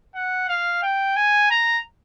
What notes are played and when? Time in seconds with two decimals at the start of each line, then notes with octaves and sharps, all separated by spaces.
0.15 F#5
0.49 F5
0.83 G5
1.16 G#5
1.50 A#5